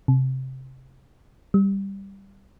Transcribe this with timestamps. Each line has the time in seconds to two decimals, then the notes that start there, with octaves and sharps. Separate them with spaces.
0.08 C3
1.54 G3